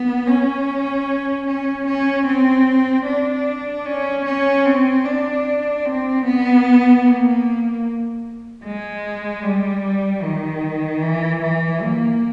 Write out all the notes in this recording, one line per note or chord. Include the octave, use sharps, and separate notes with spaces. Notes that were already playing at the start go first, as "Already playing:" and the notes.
Already playing: B3
C#4
C#4
C#4
C4
D4
C#4
C#4
C4
D4
C4
B3
A#3
G#3
G3
D#3
E3
E3
A#3